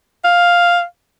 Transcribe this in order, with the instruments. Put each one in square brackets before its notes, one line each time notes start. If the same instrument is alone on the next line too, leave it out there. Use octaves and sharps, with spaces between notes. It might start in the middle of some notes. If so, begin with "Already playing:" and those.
[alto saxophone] F5